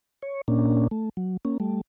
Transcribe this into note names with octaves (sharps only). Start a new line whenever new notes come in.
C#5
A#2 A#3 C#4 D4
A3
F#3
A#3 C#4
G3 A3